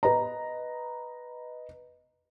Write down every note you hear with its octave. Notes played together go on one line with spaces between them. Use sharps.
B4 D#5 A#5